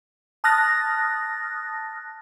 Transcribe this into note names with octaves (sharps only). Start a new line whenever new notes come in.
A5 D#6 F6 F#6 A6 A#6